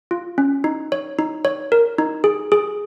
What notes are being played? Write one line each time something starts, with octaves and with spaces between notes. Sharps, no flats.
F4
C#4
D#4
C#5
D#4
C#5
A#4
D#4
G#4
G#4